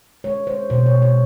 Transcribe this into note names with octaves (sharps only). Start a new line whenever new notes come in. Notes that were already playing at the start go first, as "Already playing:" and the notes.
G#3 C#5
G#3 C5
B2 C5
C#5
G#3
C#5